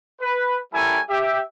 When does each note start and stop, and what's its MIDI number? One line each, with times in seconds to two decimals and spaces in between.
0.21 0.56 71
0.73 0.99 55
0.73 0.99 61
0.73 0.99 64
0.73 0.99 69
0.73 0.99 70
0.73 0.99 80
1.09 1.40 67
1.09 1.40 76